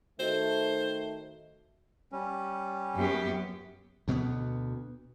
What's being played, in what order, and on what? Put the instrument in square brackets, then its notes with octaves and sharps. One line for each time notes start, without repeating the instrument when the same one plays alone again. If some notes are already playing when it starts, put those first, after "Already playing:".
[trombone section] D#3 A3 [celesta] F#4 A4 D#5 [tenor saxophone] C5
[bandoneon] G3 C#4
[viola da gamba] F#2 B3 G4
[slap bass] D2 B2 G#3 B3